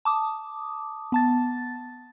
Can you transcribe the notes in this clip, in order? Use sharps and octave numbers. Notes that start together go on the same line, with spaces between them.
A5 D6 D#6
B3 A5 A6